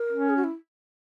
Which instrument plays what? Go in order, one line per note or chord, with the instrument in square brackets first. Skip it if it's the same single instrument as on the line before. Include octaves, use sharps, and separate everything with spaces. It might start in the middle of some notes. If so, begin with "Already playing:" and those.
Already playing: [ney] A#4
[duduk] C#4
[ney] G#4
F#4
E4